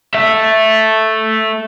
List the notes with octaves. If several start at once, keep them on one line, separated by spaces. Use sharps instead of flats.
A4 E5